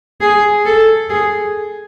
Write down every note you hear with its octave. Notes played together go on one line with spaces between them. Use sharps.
G#4
A4
G#4